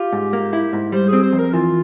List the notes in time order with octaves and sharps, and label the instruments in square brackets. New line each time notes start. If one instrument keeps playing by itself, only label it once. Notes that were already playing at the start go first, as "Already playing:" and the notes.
Already playing: [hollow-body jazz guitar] F4 [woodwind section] G4
[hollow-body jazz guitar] G#2
A#3
E4
G#2
[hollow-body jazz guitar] G3 [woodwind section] C5
[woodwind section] G#4
[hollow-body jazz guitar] C4
[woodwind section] C5
[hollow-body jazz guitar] F2
[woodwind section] A#4
[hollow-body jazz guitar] E3 [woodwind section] F4